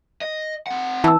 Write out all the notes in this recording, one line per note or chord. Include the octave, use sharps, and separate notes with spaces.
D#5
C4 F#5
E3 A5 E6